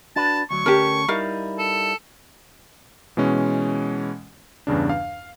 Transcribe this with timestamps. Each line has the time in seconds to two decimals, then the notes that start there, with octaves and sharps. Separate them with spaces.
0.16 D4 F#4 B4 A5
0.51 D2 F#3 C#6
0.66 D2 C#4 G4 A4 A#4
1.08 G3 D#4 E4 A#4 F5
1.59 A4
3.17 B2 E3 G#3 C#4
4.67 E2 G2 C#3 D4
4.89 F5